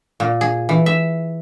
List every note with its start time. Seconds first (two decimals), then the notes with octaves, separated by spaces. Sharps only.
0.20 A#2
0.41 G#4
0.69 E3
0.86 E5